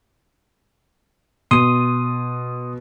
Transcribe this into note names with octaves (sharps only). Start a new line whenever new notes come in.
B2 C6 D#6 D#7